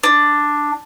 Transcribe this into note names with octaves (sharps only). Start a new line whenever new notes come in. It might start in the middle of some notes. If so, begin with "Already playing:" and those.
D4